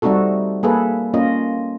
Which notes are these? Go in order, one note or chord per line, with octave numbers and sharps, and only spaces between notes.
G3 A3 C4 D#4 F#4 A4
A#3 G#4 A4 B4
A#3 C#4 F4 D#5